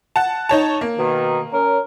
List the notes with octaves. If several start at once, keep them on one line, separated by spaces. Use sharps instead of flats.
F#5 A5
D#4 C#5 A5
A#3
B2 D#3
C#4 A#4